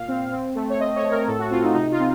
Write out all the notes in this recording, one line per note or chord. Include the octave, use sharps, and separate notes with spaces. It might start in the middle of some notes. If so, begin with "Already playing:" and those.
Already playing: A#2 F5
C4
C4
A3
C#5
C4 D#5
C#5
A3
A#4
A2 A4
F#4
C4 F4
D#4
C3 D#4
F4
C4